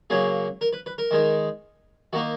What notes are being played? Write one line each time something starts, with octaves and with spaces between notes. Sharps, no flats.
C#3 F#3 A#3 C#4 G#4
A#4
B4
B4
A#4
D#3 G#3 D#4
D#3 A#3 D#4 F#4